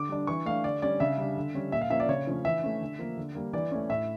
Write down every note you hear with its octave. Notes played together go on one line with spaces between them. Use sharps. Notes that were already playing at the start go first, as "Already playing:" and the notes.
Already playing: D3 D6
G3 D4
E3 C#6
A3 D4 F5
D3 D5
G3 C#4 D5
C#3 E5
G3 D4
D3
G3 C#4
A#2 E5
F5
F3 A#3 C#4 E5
D5
C#3 C#5
F3 A3 C#4
E3 E5
A3 C#4
D3
F3 A#3
D3
G3 A#3
E3 D5
A3 C#4
A2 E5